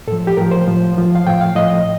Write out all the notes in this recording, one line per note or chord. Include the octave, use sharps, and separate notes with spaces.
A2 F3 A4
G4
A2 F3 A#4
C5
A2 F3
A2 F3
F5
A2 F3 G5
F5
A2 F3 D#5
D#5